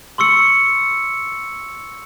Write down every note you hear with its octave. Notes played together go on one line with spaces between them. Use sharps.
C6 C#6 E6 C#7